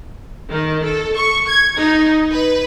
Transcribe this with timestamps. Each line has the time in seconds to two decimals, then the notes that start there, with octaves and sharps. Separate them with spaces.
0.51 D#3
0.85 A4
1.16 C#6
1.49 G#6
1.78 D#4
2.32 B4